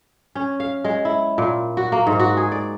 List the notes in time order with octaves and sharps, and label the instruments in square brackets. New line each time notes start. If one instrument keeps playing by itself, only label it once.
[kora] C#4
F5
G#3
E4
A#2
F#4
A#3
G#2
F#4
G#4
D5